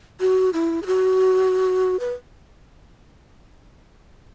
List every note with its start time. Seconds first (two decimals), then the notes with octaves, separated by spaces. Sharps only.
0.20 F#4
0.53 E4
0.82 G#4
0.87 F#4
2.00 B4